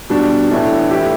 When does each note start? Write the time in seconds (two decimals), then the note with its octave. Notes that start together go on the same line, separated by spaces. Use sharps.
0.10 B2 G3 D4
0.50 A2 E3 A3 D4
0.91 A3 E4 G4